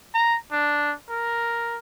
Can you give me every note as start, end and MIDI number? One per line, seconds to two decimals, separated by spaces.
0.14 0.37 82
0.52 0.93 62
1.09 1.78 70